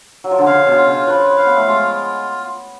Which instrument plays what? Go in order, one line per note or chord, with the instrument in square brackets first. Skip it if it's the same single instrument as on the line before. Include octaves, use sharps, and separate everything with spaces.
[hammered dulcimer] F#3
F3
D3
[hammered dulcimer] C#3 [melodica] F5
[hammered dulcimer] B2
[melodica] F4
[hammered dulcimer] C#3
[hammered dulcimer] F3 [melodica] B4
[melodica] F5
[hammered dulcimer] B3
A3
[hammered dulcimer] G#3 [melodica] F4